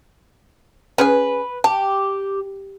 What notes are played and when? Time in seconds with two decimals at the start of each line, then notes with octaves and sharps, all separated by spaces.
0.98 C#4 G#4 B4 G#5
1.64 G4 A5